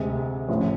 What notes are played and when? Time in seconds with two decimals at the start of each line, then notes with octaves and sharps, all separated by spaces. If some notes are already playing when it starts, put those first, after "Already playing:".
Already playing: D2 C3 G#3 C4
0.48 A1 A2 F3